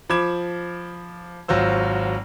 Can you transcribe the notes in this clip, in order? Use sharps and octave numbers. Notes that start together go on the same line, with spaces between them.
F3 B5 D6 G#6 E7
G#1 F#3 F4 C5 E6